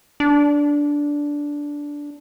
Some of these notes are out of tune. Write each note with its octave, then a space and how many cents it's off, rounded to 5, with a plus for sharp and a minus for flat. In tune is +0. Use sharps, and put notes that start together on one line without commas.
D4 -10